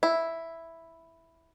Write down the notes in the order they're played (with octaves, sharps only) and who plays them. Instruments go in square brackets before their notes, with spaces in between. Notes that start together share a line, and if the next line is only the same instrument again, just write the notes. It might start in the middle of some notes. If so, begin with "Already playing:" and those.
[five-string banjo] E4